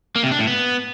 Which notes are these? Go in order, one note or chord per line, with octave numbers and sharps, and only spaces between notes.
A#3
C3
D4
A2
B3